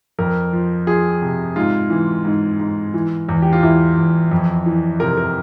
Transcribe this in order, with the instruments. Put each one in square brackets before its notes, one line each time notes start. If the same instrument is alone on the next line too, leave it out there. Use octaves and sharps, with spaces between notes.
[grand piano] F2 A#4
F3
F3 G#4
C3
G#2 F4
E3
G#2
G#2
E3
E2
G4
F4
E2 E4
E2
F2
E3
C3 A#4
A#4